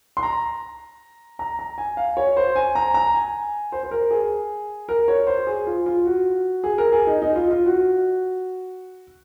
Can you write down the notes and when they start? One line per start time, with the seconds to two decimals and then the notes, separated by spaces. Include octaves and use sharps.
0.17 C6
0.23 A#5
1.39 A#5
1.59 A#5
1.78 G#5
1.97 F5
2.17 C#5
2.37 C5
2.56 G#5
2.75 A#5
2.94 A#5
3.14 G#5
3.72 C5
3.83 C5
3.91 A#4
4.11 G#4
4.89 A#4
5.08 C#5
5.27 C5
5.47 G#4
5.67 F4
5.86 F4
6.05 F#4
6.64 G#4
6.78 A#4
6.92 G#4
7.07 D#4
7.22 D#4
7.36 F4
7.51 F4
7.66 F#4